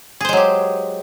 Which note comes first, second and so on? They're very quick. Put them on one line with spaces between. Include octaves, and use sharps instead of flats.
G#4 C5 G#3 F#3 G4